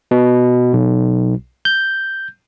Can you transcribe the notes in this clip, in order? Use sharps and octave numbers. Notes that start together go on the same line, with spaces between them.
B2
B1
G6